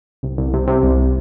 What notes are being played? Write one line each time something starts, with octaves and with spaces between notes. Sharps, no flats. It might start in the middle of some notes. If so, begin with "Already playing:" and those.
C2
C2
C3
C3
C2